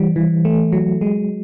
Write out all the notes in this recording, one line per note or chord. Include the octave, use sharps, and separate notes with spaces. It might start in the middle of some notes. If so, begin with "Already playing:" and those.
Already playing: E3 G3
E3
A3
F#3
G#3